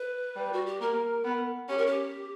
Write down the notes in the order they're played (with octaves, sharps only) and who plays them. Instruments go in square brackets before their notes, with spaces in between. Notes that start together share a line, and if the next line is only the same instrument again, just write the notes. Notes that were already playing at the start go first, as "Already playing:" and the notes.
Already playing: [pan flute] B4
[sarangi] G3
[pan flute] F#4
G4
[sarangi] A#3 [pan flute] A#4
[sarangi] B3
[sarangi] C#4 [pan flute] G4
[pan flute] A#4
G4